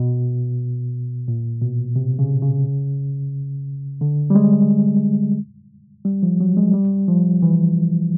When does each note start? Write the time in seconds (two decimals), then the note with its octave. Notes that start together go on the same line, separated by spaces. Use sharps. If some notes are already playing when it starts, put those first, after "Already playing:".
Already playing: B2
1.28 A#2
1.62 B2
1.96 C3
2.19 C#3
2.42 C#3
4.01 D3
4.30 G3
4.35 G#3
6.05 G3
6.23 F3
6.40 F#3
6.57 G#3
6.74 G3
7.08 F3
7.42 E3